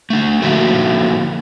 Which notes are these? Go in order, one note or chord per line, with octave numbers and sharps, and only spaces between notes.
A3 D4
D3 F3 A#3 E4 F#4 A4